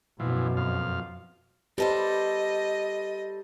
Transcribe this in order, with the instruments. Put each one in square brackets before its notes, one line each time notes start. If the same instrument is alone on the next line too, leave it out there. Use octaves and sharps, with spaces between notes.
[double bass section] F#2 B2 [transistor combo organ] E3 F3
[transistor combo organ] F2 F5
[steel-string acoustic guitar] G3 A4 C5 [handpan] G4 B4 [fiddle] D#5